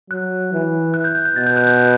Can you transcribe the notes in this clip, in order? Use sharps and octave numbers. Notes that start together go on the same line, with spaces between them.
F#3 F#6
E3
F#6
G6
G6
G6
B2 A6
G6
F#6
G6